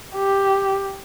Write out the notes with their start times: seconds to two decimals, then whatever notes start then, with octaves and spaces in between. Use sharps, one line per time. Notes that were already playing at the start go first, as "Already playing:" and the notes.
0.15 G4